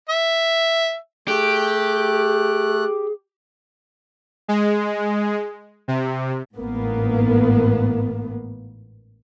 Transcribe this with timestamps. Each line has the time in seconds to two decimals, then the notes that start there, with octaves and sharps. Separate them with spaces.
0.09 E5
1.28 A3 G4 G#4 F#6
4.48 G#3
5.88 C3
6.57 A1 G#2 A#3 B3